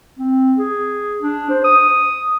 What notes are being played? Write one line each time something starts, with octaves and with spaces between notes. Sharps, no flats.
C4
G#4
D4
C5
D#6